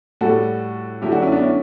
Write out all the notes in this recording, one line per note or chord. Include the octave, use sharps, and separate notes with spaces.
A2 G3 F#4 A4
D3 F#3 A3 E4 G4
D4 F#4
C#4 E4
B3 D4
C#4 E4